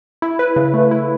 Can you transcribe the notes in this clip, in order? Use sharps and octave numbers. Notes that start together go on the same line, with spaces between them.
E4
B4
C#3
A3
E4